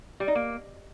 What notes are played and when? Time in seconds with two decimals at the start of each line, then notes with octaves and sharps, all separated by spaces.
0.20 G3
0.28 D#4
0.35 A#3